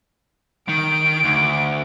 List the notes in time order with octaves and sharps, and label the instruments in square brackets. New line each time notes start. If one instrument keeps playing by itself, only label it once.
[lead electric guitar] D#3 [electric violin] D7
[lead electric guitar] D2